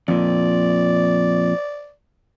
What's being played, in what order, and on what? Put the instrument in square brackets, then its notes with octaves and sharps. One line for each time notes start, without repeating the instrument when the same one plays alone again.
[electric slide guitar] F2 A#2 [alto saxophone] D5